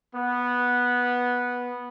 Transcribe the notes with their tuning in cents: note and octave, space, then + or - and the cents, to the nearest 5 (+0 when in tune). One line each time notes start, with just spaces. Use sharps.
B3 -10